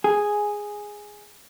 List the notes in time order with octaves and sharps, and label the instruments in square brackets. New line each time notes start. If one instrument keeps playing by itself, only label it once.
[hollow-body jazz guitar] G#4